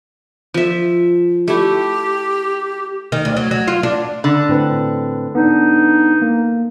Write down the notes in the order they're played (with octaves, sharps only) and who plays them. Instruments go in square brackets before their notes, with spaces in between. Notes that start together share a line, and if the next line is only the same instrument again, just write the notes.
[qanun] F3 E5
[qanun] A3 E4 [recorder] G4
[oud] D#3
D2
F#3
F#3
F4
D4
[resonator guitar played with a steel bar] D3
[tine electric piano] A2 C4 B4
[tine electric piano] B3 D4 [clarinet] D#4
[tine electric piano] A#3